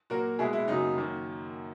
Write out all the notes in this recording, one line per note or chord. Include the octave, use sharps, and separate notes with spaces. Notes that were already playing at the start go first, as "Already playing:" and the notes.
A#2 F#3 A#3 F#4 A#4
B2 G#3 E4 G#4
E4
F#2 C#3 F#3 A#3 D#4
F#2 D#3 A#3